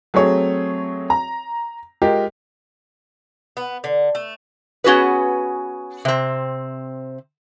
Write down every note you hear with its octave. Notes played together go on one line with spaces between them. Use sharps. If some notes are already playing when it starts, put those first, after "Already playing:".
F#3 A3 C4 G#4 C#5
A#5
G#3 F4 G4 A#4
B3
D3
A3
B3 C#4 F#4 G#4 B4
C3 C4